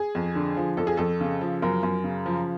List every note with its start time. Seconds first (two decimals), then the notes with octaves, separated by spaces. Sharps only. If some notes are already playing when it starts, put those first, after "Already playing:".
Already playing: G#4
0.15 F2
0.35 D3
0.57 F3
0.77 F2 A4
0.87 G#4
0.97 F2 A4
1.21 C#3
1.41 F3
1.62 F#2 A#4
1.83 F#2
2.04 C#3
2.26 F3